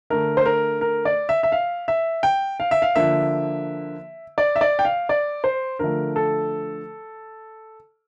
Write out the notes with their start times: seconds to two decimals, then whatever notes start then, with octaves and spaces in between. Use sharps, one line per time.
0.10 D3 A3 A#4
0.37 C5
0.46 A#4
0.81 A#4
1.05 D5
1.29 E5
1.43 E5
1.52 F5
1.88 E5
2.23 G5
2.60 F5
2.71 E5
2.82 F5
2.95 D3 F3 A#3 E5
4.38 D5
4.56 E5
4.61 D5
4.79 G5
4.85 F5
5.09 D5
5.44 C5
5.79 D3 F3 A3 A#4
6.16 A4